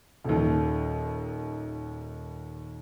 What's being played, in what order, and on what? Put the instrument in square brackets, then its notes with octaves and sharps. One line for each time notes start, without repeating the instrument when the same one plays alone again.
[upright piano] D#1 D#2